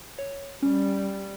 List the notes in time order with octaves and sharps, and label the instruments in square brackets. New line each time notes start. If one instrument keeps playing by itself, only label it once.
[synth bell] C#5
[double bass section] G3 [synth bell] C#4